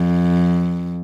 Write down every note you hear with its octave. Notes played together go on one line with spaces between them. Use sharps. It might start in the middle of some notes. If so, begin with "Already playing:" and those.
Already playing: F2